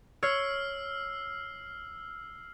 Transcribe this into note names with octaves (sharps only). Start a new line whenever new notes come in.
C#5 E6 F6 C7